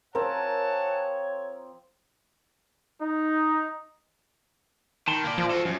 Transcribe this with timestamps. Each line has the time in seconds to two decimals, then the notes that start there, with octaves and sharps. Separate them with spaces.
0.15 F3 C4 A#4 C#5 F#5 G#5 A5
3.00 D#4
5.08 D#3 A5 B5 C6
5.24 A#3 D5
5.38 F3
5.50 F4 F#4 A4
5.65 F#2